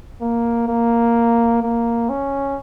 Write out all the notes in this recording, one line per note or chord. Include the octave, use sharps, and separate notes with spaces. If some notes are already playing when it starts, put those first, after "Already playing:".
A#3
A#3
A#3
C#4